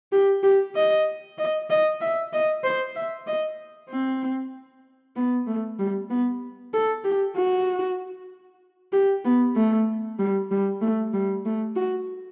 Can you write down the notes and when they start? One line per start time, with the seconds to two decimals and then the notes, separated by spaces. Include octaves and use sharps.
0.12 G4
0.43 G4
0.75 D#5
1.38 D#5
1.70 D#5
2.01 E5
2.33 D#5
2.64 C5
2.96 E5
3.27 D#5
3.90 C4
5.16 B3
5.47 A3
5.79 G3
6.10 B3
6.73 A4
7.04 G4
7.36 F#4
8.93 G4
9.25 B3
9.56 A3
10.19 G3
10.51 G3
10.81 A3
11.13 G3
11.46 A3
11.76 F#4